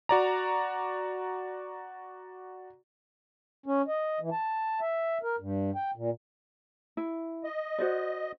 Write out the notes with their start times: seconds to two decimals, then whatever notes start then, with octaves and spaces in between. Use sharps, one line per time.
0.09 F#4 D5 A#5
3.66 C#4
3.88 D#5
4.20 E3
4.32 A5
4.81 E5
5.23 A#4
5.40 G2
5.75 G5
5.96 A#2
6.97 E4
7.44 D#5
7.78 F#4 C5 D5